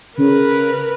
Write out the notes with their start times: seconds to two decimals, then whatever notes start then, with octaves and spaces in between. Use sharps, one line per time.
0.18 C#3 A#4 B4